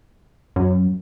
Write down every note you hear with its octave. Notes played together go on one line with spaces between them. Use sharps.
F#2